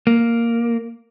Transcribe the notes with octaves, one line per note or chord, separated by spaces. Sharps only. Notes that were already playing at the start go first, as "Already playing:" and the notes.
A#3